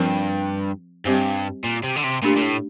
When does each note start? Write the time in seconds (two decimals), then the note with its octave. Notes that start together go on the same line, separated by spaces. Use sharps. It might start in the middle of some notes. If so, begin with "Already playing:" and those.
Already playing: G2 F3 C4 F4 A#4
1.05 G2 G3 C4 G4 C5
1.64 A#2
1.83 C3
1.96 D3
2.04 C3
2.23 A#2 A3 D4 G4
2.37 A#2
2.42 A2